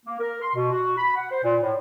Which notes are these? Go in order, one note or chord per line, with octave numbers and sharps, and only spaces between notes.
A#3
A#4
C6
B2
F#4
B5
F#5
C5
A#2
A2